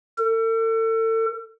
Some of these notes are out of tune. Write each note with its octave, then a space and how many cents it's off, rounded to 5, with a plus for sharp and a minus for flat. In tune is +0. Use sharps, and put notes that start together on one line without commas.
A4 +40